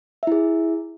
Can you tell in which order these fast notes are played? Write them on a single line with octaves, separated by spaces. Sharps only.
E5 E4 G#4